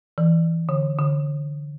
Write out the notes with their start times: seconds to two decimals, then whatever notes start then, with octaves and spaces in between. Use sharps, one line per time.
0.18 E3
0.69 D3
0.99 D3